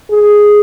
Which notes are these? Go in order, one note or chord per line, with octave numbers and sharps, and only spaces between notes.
G#4